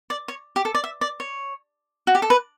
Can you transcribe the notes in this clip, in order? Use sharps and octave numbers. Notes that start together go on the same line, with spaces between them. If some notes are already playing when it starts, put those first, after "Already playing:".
D5
C#5
G4
A4
D5
E5
D5
C#5
F#4
G4
A4
B4